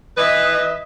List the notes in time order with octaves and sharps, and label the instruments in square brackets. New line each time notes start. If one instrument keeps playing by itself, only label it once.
[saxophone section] E3 B4 [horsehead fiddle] D#5 E5